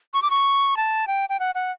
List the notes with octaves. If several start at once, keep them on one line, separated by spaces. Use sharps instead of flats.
C#6
D6
C#6
A5
G5
G5
F#5
F#5